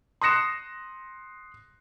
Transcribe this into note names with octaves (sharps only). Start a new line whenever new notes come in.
C6 D#6 F#6 A#6 C#7 E7